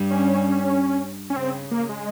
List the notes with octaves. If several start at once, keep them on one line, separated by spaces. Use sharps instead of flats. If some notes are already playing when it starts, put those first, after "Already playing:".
Already playing: G2 G3
C#4
C#4
C#3 C4
A#3
G#3